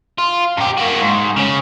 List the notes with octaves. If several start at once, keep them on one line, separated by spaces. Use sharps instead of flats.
F4
F#2 G4
A#3 F#4
G#2
C#3 C#4